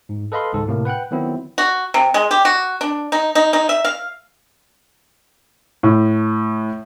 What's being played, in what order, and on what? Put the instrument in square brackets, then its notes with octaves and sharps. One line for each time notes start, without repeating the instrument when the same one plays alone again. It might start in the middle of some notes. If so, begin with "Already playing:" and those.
[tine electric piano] G#2
A4 B4 D#5 F5 B5 C6
G#1 C#2 G#2 A4
A2 C3 A#3
B4 F#5 G5 F#6
D#3 F#3 B3 C4 E4
[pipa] F#4
C3
G#3
G4
F#4
D4
D#4
D#4
D#4
E5
F5
[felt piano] A2